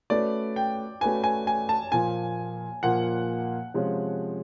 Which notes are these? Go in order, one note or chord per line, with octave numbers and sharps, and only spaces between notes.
A3 C#4 F#4 B4 D5
G5
A3 C#4 F#4 B4 G#5
G#5
G#5
A5
A#2 F3 A#3 G#5
A#2 F3 A#3 F#5
C3 F3 G#3 C#4 F4